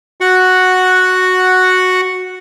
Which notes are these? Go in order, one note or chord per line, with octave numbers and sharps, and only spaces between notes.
F#4 F#5